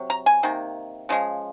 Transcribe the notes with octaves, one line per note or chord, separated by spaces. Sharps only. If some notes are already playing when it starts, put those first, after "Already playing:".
Already playing: C3 F#3
A#5
G#5
C3 D#3 A#3
C#3 F3 G#3